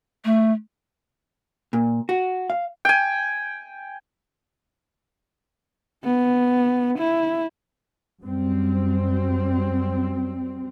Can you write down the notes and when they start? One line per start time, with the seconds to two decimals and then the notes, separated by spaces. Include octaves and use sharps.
0.25 A3
1.73 A#2
2.09 F#4
2.50 F5
2.85 G5 G#5
6.04 B3
6.98 E4
8.21 F#2 G3 C4